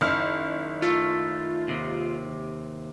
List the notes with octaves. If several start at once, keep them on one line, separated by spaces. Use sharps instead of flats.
F#1 D#3 E4 F6
A3 F4
D#2 C3